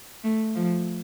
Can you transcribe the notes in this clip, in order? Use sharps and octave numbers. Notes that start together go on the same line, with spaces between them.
A3
F3